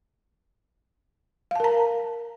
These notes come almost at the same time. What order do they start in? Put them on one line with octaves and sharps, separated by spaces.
F5 A5 A#4 A#5